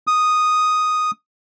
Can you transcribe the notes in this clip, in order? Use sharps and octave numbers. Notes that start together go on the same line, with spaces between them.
D#6